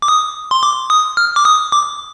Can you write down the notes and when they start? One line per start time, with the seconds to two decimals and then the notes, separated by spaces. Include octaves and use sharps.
0.02 D6
0.08 D#6
0.51 C6
0.63 D6
0.90 D#6
1.17 F6
1.36 D6
1.45 D#6
1.72 D6